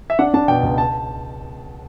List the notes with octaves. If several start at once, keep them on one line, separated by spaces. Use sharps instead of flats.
E5
D4 F#5
D4 A5
B2 G5
C#2
A5